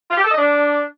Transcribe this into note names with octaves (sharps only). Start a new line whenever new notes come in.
F4
G4
A4
D#5
D4